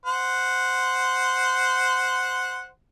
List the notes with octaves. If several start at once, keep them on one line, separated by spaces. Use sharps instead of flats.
C5 F#5